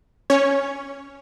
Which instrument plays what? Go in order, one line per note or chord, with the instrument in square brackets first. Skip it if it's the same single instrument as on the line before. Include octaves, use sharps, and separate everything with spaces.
[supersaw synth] C#4 C#5